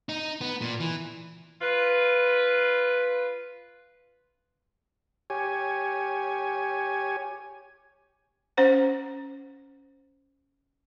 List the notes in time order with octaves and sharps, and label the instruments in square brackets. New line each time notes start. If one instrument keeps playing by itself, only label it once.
[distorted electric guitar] D#4
B3
A#2
E3
[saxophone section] F4 B4
[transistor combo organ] G4 C#5 G#5
[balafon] C#4 C5 F#5